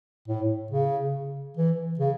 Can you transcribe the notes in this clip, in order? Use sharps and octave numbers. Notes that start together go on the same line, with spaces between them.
A2
C#3
E3
C#3